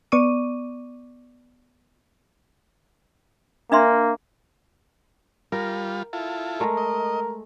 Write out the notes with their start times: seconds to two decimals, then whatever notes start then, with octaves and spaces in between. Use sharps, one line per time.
0.12 B3 D5 C#6 D6 D#7
3.72 A#3 D4 E5 C6
5.52 G3 F4 A#4
6.13 E4 F4 A4
6.60 G#3 A3 A#4
6.77 D#5